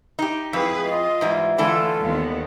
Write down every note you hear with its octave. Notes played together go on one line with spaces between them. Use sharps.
D#4 G4
F2 E4 G#4 B4
F4 D#5
G#2 E3 G3
D3 E3 A3 F4 A4
D#2 D#3 B3